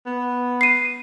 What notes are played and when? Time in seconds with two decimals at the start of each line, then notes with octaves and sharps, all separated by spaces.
0.06 B3
0.61 C7 D#7